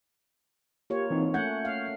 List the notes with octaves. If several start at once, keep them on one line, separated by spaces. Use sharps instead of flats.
A#3 F4 G4 C#5
E3 C4 D#4
A3 C#4 F#5 G6 G#6
F5